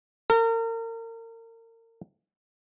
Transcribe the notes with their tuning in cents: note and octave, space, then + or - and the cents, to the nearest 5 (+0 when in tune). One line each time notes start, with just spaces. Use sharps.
A#4 -35